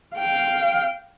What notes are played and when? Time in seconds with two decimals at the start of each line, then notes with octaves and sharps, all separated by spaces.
0.17 F5 G5